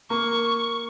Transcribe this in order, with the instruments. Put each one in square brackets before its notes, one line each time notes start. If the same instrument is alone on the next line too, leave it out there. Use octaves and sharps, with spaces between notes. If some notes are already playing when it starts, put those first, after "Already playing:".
[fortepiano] A#3 [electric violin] C#6